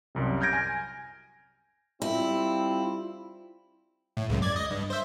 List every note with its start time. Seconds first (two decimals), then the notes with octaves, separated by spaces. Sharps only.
0.15 C2 F#2 C3
0.41 F6 G6 G#6 A#6 D7
0.53 G#5
2.02 G3 C4 E4 F4
4.17 A2
4.29 C#2 F#2
4.42 D5 G#6
4.56 D#5
4.71 G2
4.90 C5 E5